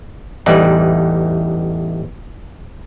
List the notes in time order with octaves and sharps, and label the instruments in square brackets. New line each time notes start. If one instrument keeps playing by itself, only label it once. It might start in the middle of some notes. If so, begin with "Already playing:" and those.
[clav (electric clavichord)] A1 E2 E3 G3 D#4 D5